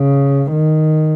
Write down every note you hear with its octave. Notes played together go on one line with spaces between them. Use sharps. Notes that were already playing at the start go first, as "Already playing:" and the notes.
Already playing: C#3
D#3